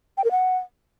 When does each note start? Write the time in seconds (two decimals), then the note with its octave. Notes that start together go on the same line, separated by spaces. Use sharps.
0.17 G5
0.24 A#4
0.31 F#5